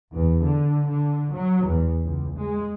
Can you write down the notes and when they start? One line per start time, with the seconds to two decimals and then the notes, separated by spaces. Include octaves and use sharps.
0.13 E2
0.44 D3
0.89 D3
1.34 F#3
1.67 E2
2.04 C#2
2.36 G#3